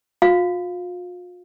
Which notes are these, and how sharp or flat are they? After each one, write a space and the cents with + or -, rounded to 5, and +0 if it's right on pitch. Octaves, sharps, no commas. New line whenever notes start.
F4 +45 F5 +0